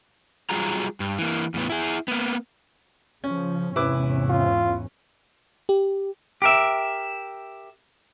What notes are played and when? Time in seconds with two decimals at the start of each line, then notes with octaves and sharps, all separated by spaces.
0.50 F#3 G3 F4 G#4 A#5
1.00 G2
1.18 E3 A#3
1.54 E2 A2 B3
1.70 E4 G#4
2.08 A#3 B3
3.24 C#3 F3 C#4
3.76 E2 G#2 C3 C#4 E4 B4 D6
4.30 F4
5.69 G4
6.42 G4 A#4 E5